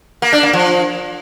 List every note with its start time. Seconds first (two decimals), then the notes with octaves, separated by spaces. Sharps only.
0.22 A#3
0.33 D4
0.43 A#3
0.53 F3